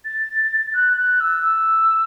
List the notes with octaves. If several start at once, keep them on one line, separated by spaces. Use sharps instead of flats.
A6
F#6
F#6
E6
E6